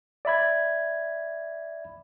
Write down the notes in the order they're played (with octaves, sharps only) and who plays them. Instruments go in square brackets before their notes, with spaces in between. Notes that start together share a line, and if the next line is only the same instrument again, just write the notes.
[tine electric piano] D5 E5 B5 G#6